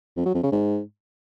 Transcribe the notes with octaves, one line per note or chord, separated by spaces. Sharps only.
F2
F#3
F2
C#3
G#2